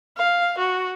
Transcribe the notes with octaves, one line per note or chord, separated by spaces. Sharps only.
F5
F#4